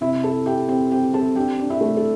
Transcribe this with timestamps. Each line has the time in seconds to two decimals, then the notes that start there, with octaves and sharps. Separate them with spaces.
0.01 C3 E4 E5
0.23 E4 A4 A5
0.46 E4 G4 G5
0.68 C4 G4 G5
0.91 C4 G4 G5
1.13 C4 A4 A5
1.36 D4 G4 G5
1.60 D4
1.70 E4 E5
1.81 A3
1.97 A4